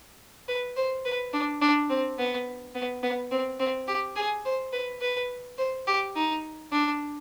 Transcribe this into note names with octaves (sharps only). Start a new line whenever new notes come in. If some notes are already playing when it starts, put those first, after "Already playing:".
B4
C5
B4
D4
D4
C4
B3
B3
B3
C4
C4
G4
G#4
C5
B4
B4
C5
G4
D#4
D4